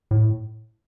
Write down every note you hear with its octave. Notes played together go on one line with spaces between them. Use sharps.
A2